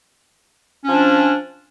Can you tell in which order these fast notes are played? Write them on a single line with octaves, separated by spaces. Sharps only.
C#4 F3 D4